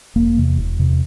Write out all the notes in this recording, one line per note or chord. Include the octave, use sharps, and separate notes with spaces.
E1 A#3
E2 C3
E1
E2 C3